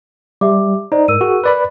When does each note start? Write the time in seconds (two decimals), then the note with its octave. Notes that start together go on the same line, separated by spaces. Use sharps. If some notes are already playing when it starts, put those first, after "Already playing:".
0.41 G3 G4 E5 D6
0.92 D#4 C5 D5
1.08 G#2 A#4 E6 D#7
1.21 F#4 G#4
1.44 B4 D5 B5